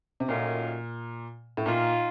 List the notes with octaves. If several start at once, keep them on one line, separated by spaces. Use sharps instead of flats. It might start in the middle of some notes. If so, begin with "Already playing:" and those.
C3
F#2 A#2 D#3 A3 C#4 F4
A2
A#2 D#3 A#3 F4